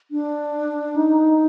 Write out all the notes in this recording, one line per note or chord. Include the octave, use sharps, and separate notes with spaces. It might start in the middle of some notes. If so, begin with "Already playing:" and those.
D4
D#4